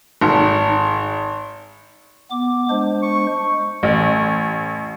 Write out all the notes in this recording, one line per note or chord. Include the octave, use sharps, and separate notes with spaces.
G#1
B3 D6
G#3 D4 C5
C#6
A1